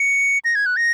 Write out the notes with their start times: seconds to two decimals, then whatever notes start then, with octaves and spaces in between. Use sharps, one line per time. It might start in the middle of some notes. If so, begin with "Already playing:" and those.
Already playing: C#7
0.45 A#6
0.55 G#6
0.66 F#6
0.77 A#6